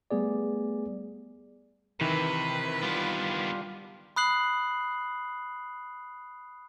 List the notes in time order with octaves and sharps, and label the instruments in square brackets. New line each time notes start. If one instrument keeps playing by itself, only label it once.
[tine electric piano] G3 A3 B3 G#4 D5
[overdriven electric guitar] C3 [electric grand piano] D#3 E3 [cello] B4
[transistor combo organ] G3 F4 [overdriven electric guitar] B3 D4
[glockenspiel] B5 D#6 F#6 C7 F#7